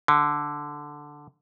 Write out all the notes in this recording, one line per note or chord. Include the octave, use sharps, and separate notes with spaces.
D3